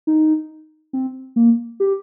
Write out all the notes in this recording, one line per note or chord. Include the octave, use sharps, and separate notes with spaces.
D#4
C4
A#3
G4